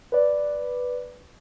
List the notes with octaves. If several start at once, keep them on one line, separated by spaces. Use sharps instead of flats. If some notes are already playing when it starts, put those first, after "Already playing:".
B4 D5